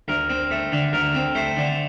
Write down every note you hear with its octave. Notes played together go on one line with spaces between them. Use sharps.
D2 A#4
C4
A3
D3
D2 A#4
C4
A3 C5
D3